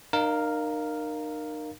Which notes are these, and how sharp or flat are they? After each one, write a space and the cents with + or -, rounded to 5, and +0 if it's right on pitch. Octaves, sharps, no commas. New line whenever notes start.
D#4 -40 A#4 +0 F5 +0